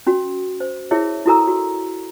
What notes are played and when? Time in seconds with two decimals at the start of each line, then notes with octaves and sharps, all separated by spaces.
0.07 C#4 F#4
0.60 C5
0.91 E4 G#4 A#4 C#5 E5
1.26 E4 F#4 A4 A#4 A#5 E6
1.47 F#4